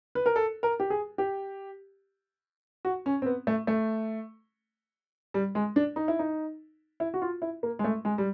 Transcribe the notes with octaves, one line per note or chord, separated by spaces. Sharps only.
B4
A#4
A4
A#4
G4
G#4
G4
F#4
C#4
C4
B3
A3
A3
G3
G#3
D4
D#4
E4
D#4
E4
F#4
F4
E4
A#3
G#3
A3
G#3
G3